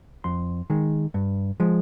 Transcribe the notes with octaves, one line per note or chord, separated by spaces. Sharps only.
F2 C6
D#3 G#3
G2
F3 G#3